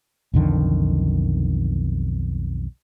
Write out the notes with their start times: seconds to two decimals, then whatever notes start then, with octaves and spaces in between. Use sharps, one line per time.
0.33 B1 F2 D3 D#3